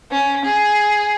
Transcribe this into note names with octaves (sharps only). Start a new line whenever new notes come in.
C#4
G#4